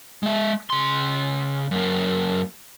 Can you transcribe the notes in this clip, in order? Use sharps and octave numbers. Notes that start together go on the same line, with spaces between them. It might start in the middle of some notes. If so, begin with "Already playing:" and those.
G#3 E5
C#3 C6
F#2 A#3